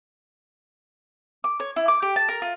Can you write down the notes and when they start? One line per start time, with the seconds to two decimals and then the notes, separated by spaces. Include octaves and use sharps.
1.44 D6
1.60 C#5
1.76 E4
1.88 D6
2.02 G4
2.16 A5
2.29 A#4
2.42 F4